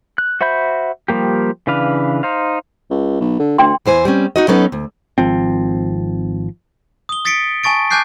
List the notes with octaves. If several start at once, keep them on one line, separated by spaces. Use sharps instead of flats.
F#6
F#4 C5 E5 B5 G6
F3 G3 A#3 G4
C#3 E3 D4 B4 F5
D#4 C5 F5
C#2
B1
D3
D2 D4 G5 C6
E2 E3 C5 G#5
G3 C4 C#4
D#4 F#4 D#5
F#3 B3 C#4 D#4 A4 B4
D2
G#1 F3 C4
D#6 G7
D#6 A6 B6 C#7 D7
G#5 A5 C#6 A6 D7
G#5 A5 D6 F#6 G6 C7